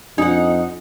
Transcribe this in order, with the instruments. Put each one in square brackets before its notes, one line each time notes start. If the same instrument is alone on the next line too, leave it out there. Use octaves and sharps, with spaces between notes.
[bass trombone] F2 [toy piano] D4 [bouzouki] D#4 F#5